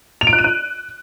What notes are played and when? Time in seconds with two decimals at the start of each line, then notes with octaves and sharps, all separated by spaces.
0.21 F7
0.27 D7
0.33 F#6
0.39 D#7
0.44 F#6